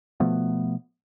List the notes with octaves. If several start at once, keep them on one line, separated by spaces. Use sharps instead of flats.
B2 F3 A3 B3